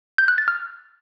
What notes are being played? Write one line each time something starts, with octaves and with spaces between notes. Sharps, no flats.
G6
F#6
A6
F6